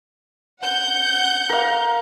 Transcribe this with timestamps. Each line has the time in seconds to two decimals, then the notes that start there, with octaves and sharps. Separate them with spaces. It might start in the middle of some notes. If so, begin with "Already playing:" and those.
0.62 F#5 G6
1.49 A#4 F5